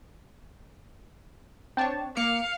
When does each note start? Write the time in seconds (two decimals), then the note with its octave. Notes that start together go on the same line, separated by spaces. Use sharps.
1.77 C4 D4 C#5 G5 A5
2.17 A#3 F5 D6 C#7